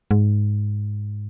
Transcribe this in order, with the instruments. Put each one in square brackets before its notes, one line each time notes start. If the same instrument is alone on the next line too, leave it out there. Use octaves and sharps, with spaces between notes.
[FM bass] G#2